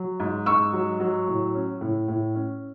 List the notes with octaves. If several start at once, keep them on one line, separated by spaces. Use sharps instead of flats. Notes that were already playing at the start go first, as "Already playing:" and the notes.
Already playing: F#3
G#2
G#2 C#6 E6
F#3
F#3
A2
C#4
A2
A2
C#4